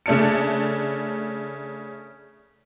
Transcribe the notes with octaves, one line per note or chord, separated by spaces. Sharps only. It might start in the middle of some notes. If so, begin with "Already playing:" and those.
C#3 A3 D4 A5 C#7